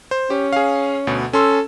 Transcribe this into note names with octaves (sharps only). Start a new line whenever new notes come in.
C5
C#4 G4
G#4 F5
D2 B2
C#4 A4 C6 E6